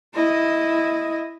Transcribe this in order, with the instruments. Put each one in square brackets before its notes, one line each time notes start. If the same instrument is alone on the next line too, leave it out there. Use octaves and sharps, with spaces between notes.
[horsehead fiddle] E4 D#5